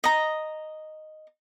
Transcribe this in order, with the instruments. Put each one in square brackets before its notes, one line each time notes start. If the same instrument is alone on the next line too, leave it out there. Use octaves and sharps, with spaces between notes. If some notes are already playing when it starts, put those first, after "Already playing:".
[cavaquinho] D#5 A#5